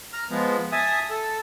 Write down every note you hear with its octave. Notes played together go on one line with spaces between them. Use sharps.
A#5 F6
F3 G#3 B3
E5 G#5 A5 D#6
A4